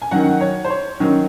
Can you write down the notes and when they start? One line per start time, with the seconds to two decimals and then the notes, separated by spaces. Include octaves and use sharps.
0.02 G#5
0.11 D#3 F#3 C#4 F#5
0.41 C#5
0.64 C5
0.70 C#5
1.00 D#3 F#3 C#4